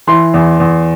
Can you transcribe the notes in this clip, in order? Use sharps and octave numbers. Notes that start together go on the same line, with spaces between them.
E3 C6
E2
E2